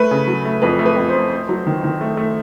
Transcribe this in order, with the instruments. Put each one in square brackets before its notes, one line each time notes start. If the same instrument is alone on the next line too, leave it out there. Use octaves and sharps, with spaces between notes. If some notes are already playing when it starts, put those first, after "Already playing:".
Already playing: [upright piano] A3 B4
C#3
F#3
A3
F2 B4
A3
B4
F2
C5
A3
A3
F#3
D#3
D#3
A3
A3